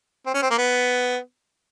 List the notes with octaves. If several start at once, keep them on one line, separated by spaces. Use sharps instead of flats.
C4
C#4
C4
A#3
B3